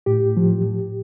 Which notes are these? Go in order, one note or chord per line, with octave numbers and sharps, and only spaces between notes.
A2 G4
F3